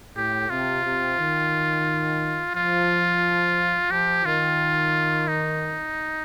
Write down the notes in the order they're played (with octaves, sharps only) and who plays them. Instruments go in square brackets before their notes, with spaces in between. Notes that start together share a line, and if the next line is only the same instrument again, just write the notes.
[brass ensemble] A2 [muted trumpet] G4
[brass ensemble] C3 [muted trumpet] F4
[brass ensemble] C3
D#3
[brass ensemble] F3 [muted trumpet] F4
[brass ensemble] F3 [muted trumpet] G4
[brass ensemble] D#3 [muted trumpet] F4
[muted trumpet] D#4